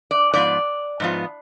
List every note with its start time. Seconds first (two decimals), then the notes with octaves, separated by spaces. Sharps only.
0.11 D5
0.33 G#2 F3 B3 F4 D5
1.00 G#2 F3 B3 F4